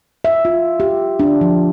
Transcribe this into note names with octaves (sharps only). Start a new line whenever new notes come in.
E5
F4
G4
D4
F3